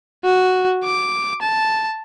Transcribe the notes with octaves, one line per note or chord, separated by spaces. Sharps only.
F#4
D6
A5